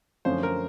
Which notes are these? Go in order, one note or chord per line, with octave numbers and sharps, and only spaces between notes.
F#2 D3 F3 A3 C#4 C5
A#4